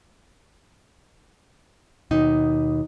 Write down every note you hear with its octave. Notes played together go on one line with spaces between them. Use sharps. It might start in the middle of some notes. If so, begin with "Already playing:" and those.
D#2 B2 D#4